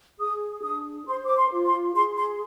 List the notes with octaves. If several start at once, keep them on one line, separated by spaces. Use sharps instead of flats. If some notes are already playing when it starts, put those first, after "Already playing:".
G#4 D#6
D4 D#6
C5 C6
D6
C6
F4
C6
G#4 C6
C6